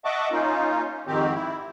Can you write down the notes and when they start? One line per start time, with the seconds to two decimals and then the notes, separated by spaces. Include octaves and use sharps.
0.05 D#5 E5 F#5 A5 C#6 D6
0.31 A#3 C#4 D#4 F4
1.07 F2 G#2 D#3 C4 G4
1.34 E4